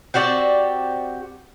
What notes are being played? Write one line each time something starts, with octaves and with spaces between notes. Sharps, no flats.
C4 F#4 G4 D5